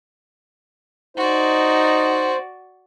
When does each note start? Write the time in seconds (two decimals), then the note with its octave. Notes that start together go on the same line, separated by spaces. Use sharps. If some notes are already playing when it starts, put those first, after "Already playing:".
1.17 D#4 F#4 C5 D5